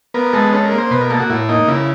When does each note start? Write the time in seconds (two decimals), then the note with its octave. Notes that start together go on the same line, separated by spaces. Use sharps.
0.14 B3 A#4
0.33 G#3 A4
0.53 C#4 A4
0.65 A#4
0.72 A#3
0.78 C5
0.91 B2 B4
1.01 A#4
1.10 A#3 A4
1.20 F#4
1.30 A2 E4
1.49 A#3 D#4
1.68 C#3 E4